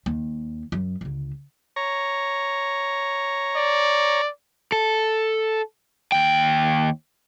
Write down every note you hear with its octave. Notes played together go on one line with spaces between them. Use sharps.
D#2
F#2
C#2 D3
C#5 A#5
D5
A4
D#2 G5